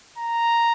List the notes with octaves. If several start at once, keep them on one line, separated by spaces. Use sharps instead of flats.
A#5